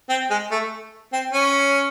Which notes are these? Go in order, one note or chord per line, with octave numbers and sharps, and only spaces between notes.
C4
G#3
A3
C4
C#4